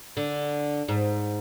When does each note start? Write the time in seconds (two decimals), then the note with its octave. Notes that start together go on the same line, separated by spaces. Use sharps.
0.17 D3
0.88 G#2